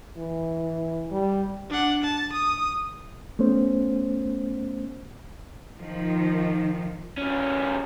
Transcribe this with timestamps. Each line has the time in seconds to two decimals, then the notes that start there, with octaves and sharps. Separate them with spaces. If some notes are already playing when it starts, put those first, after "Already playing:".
0.18 E3
1.11 G3
1.70 D4 F#5
2.04 A5
2.33 D#6
3.39 A3 B3 C#4 C5
5.77 D#3 F3
7.18 E2 C#4